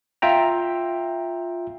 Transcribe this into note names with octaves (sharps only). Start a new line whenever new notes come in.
F4 E5 G5 A#5